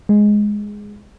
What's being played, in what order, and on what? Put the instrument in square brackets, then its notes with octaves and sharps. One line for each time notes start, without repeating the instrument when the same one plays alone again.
[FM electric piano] G#3